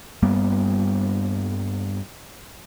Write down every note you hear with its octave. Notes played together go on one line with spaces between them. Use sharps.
G2 G3 A#3 B3